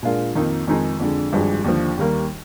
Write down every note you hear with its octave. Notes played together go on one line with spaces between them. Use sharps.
A#2 G#3 D4 F4 A#4
F2 D#3 A#3 D#4
F2 D#3 G#3 D#4 G#4
F2 D3 G#3
G#1 G2 F3 G#3
D#2 D3 F3
D#2 D#3 G3 A#3